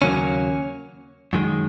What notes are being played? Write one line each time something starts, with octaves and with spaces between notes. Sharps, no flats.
D#2 C#3 F#3 A#3 C#4
F#2 D#3 G#3